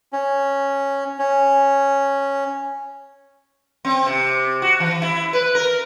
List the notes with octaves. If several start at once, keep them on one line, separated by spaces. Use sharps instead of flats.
C#4
C#4
C4
C3
F#4
E3
E4
B4
A#4